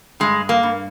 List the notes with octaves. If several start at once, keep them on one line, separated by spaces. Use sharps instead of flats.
G2 G#3
A#3
G2